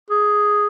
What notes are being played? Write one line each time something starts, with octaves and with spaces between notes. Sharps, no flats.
G#4